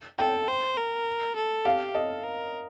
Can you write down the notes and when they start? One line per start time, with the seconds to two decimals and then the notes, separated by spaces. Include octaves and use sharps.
0.19 A4 G5
0.48 C5
0.77 A#4
1.36 A4
1.65 G4 F5
1.95 A4 D#5
2.24 A#4